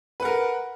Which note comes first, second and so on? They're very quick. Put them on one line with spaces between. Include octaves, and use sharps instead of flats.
B4 F#5 A#4